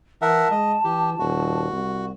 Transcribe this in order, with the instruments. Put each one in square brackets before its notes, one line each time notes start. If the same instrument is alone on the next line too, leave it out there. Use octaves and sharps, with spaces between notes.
[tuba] E3 [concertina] A#4 E5 F#5 [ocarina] A5
[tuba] G#3 [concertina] D#5
[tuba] E3 [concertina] G4
[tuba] D#1 [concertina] F#4
[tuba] C2